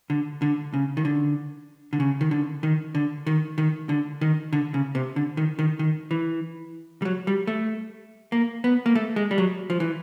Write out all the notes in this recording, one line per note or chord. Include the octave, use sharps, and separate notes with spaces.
D3
D3
C#3
D#3
D3
D3
C#3
D#3
D3
D#3
D3
D#3
D#3
D3
D#3
D3
C#3
C3
D3
D#3
D#3
D#3
E3
G3
F#3
G3
A3
A#3
B3
A#3
A3
G#3
G3
F#3
F3
E3